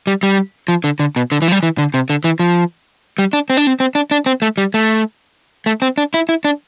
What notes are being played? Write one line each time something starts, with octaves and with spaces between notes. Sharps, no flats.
G3
G3
F3
D3
D3
B2
D3
E3
F3
G3
E3
D3
C3
D3
E3
F3
G3
D4
C4
D4
C4
C4
D4
D4
C4
A3
G3
A3
A3
C4
D4
E4
E4
D4